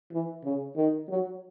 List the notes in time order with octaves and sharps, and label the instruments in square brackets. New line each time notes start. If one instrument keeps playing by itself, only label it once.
[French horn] E3
C#3
D#3
F#3